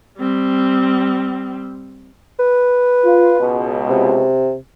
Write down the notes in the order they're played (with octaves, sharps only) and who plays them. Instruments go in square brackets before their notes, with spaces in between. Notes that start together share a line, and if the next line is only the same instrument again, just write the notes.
[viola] G3 C4
[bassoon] B4
[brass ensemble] F4
C#2 B2
[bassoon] C3